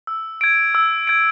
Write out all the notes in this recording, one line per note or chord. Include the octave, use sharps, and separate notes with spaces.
E6
G#6 D7
E6
G#6 D7